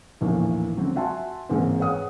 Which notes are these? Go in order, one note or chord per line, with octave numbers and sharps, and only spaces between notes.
A#1 E2 A2 D#3 E3 A#3
D3 F#3 C4
F#4 E5 F#5 G#5 A5 C6
A1 G#2 G#3 A#3 C4
G#4 B4 C#5 F#5 D#6